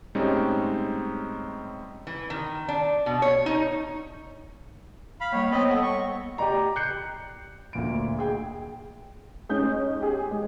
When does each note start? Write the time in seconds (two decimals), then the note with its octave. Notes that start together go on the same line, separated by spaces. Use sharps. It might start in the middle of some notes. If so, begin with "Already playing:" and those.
0.15 A2 G3 G#3 C4 C#4 D#4
2.07 E3
2.30 D#3
2.68 D4
3.06 B2
3.22 C#5
3.46 D#4
5.21 F5 B5
5.33 G3 A#3 C#5
5.51 B3 C4 C#5 D#5 G5 B5
5.71 A4 D#5 F#5
5.82 C#6
6.38 G4 D5 A#5
6.76 F#6 G6 C7 C#7
7.73 D2 A#2 D7
8.19 G#4 G5 G#5
9.49 G#3 C#4 D#4 G6
10.01 G4 G#4
10.31 G#3